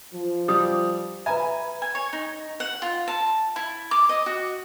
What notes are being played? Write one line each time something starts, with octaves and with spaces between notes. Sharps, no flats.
F3
G3 D#6
B4 E5 G#5 A#5 B5
G#5
C#5
D#4
F#5
F4
A5
E4
D6
D#5
F#4